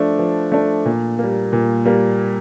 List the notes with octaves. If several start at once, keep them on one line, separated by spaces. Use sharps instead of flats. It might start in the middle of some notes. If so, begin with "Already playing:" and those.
Already playing: F3 A3 D4
F3
A3 D4
A#2
G3 A#3
A#2
G3 A#3